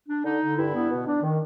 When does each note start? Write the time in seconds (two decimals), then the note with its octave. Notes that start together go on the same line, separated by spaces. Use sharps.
0.09 D4
0.25 D3 D#4
0.41 D3
0.57 G2 E4
0.74 B3
0.91 B2
1.07 D4
1.23 D#3